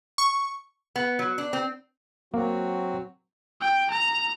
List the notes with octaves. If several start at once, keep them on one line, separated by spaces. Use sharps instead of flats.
C#6
B3
F#3
D4
C4
F#3 A#3 C4 F#4
G5
A#5